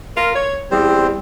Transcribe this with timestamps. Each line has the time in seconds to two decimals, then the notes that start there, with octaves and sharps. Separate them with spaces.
0.17 F4 A#4
0.35 C#5
0.71 E2 G3 C4 C5